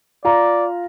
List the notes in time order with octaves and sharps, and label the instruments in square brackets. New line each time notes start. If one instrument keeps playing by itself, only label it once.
[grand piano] F4 A#5 [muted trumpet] D5